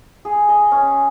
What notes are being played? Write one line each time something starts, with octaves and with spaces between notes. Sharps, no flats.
G#4
D#5
C#4